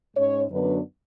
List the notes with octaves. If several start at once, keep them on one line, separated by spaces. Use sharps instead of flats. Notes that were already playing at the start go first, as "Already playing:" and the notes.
G#2 G#3 C#4 C#5
F#2 D3 F#3 B3 D4 B4